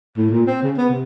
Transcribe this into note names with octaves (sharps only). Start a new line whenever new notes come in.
A2
A#2
C4
C#3
B3
C3